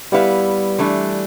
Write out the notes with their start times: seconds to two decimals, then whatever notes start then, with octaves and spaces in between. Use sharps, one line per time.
0.12 G3 B3 E4 B4 F5
0.78 E3 A3 D4